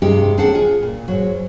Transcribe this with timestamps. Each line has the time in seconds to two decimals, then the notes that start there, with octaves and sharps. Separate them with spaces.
0.02 G2 C3 G#3 D#4 G4
0.37 D#2 C4 D4 G#4 A4 F#5
0.55 F4 G#4
0.82 A#2
1.08 G#2 F#3